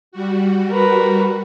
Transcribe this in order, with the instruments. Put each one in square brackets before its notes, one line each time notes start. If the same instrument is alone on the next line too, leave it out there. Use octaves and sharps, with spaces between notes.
[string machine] G3 F#4
[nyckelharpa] A#4 B4